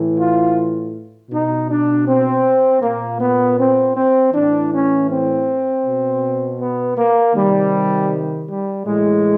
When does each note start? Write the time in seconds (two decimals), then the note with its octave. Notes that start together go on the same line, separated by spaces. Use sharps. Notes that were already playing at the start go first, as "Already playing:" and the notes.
Already playing: A2 E3
0.18 F4
1.30 B2 D#4
1.68 D4
2.06 C4
2.81 A#2 A#3
3.18 B3
3.57 C4
3.94 C4
4.32 A2 E3 D4
4.70 C#4
5.08 C4
5.83 B2
6.58 B3
6.96 A#3
7.33 C3 D#3 G3
8.47 G3
8.84 A2 E3 G#3